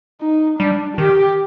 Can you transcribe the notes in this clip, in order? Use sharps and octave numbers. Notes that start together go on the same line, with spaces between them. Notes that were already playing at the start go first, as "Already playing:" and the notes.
D#4
G3 D4
D#3 G4